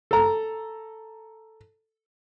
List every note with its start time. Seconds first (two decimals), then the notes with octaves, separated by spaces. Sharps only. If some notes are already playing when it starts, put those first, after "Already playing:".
0.11 A4 A#5